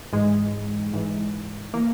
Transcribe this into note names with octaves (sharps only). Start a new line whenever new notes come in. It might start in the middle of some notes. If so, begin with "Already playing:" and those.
G#2 E3 G#3
G#2 E3
E3 A#3